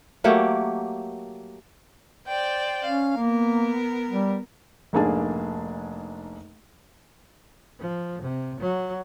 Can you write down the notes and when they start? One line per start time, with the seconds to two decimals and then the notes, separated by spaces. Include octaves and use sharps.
0.24 F#3 A3 A#3 G4
2.27 C5 D5 G5
2.84 C#4 F5
3.17 A#3 B3 A#4
4.10 G3
4.93 F1 G#2 A#3 D4 G#4 A5
7.79 F3
8.22 C3
8.60 F#3